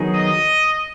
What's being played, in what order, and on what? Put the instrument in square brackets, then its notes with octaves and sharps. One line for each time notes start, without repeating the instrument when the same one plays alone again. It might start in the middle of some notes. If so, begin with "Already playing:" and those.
Already playing: [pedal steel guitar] D#3 F#3 B3 D#4 G#4
[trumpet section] D#5